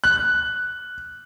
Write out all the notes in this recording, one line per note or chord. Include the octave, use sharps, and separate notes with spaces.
F#6